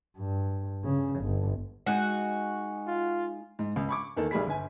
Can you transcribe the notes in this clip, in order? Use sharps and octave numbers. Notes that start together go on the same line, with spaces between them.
G2
C#3
G1
G#3 D#4 F#4 G#5
F4
G#2
C#2
B5 C#6 D6
E2 D#3 A#3 A4
B1 G3 G#4 B5 B6
G1 G#5